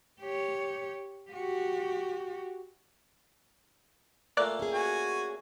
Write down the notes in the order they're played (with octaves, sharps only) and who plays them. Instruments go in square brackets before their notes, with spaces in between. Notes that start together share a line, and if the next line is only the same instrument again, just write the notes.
[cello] G4 C#5
F#4 G4
[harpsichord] A#2 A3 A#3 [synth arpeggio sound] D5 F#6
[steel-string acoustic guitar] C#4 G#4
[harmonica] F#4 G#5